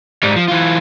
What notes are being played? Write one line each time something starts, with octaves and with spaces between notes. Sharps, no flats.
G#2 G3
F3
E3 F4